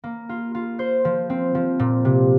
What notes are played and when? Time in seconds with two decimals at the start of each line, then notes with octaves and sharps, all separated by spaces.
0.04 A#3
0.29 F4
0.55 F4
0.79 C5
1.05 F3
1.30 C4
1.55 F3
1.79 A#2
2.05 C3